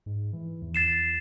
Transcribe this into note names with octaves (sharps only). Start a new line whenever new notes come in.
G#2
E3
E2
A6 C7 E7